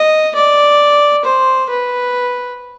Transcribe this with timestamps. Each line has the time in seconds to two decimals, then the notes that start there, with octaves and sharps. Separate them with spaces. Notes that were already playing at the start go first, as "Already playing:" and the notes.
Already playing: D#5
0.35 D5
1.24 C5
1.69 B4